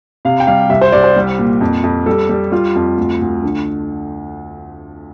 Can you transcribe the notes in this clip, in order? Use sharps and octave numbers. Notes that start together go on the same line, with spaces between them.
C3 F5
G5
G3 F5
C2 E5
C5
C2 D5
C5
G3
A#2
F2
F2
G3 A4
G3
G3 F4
F2
D2
D2
D3